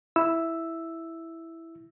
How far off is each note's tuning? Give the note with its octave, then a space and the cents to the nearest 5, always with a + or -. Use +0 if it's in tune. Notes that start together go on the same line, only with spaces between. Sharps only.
E4 +0 E6 +0